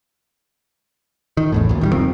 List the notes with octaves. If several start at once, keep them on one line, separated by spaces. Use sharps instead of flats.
D#3
A1 E2 A2
D2 A#2
D#3 E3 G3
F1 D#3 F3 C4